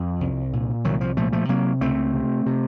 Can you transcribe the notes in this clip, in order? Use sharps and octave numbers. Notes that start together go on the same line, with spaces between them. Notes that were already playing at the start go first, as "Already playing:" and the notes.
Already playing: F2 F3
C2
A#2
C2 D#3 F#3
F3
A#2 F3 A3
F3 A3
C3 F#3 A#3
C#2 A3 C4
C3
C3